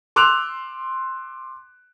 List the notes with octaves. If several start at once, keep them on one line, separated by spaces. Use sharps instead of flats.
C6 D6 E6 F#6 F7